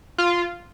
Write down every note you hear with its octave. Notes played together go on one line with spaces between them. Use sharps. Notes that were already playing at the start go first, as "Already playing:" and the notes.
F4